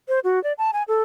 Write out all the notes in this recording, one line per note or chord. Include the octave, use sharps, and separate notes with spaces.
C5
F#4
D5
A5
G#5
A4